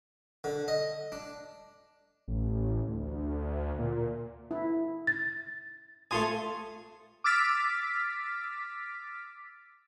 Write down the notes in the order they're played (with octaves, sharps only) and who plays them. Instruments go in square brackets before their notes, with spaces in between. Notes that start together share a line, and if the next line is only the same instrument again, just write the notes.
[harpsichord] D3
D#5
D4
[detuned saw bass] A1
D2
A#2
[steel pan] E4
[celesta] A6
[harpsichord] A3 F4 G#5 [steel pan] C6 D#6
[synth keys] D6 E6 F6 A6 B6 D7